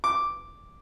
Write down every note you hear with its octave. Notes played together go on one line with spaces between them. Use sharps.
D6